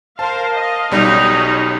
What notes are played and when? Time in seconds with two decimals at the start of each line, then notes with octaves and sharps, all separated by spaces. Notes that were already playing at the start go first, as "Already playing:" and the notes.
0.19 A#4 C5 F5 A5
0.55 D#5 F5
0.91 B1 G3 C#4 D#4 F#4